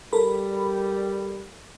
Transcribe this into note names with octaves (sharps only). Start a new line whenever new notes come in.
G3 A4 A#4 B5